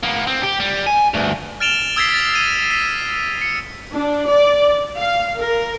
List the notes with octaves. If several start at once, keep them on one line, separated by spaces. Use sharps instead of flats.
A#3 B3
C4
G4
G3
G#5
D2 G2
F6 A6 D7 E7 F7 G7
D#6 E6 G#6 A6 B6 C7
A6 B6
A6 D#7
B6
C#7
D4
D5
F5
A#4